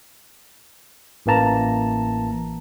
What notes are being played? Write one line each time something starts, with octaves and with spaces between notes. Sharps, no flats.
A1 E3 A#3 A5 A#5